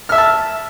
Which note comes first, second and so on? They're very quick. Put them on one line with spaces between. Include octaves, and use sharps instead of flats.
F6 E5 E6 A5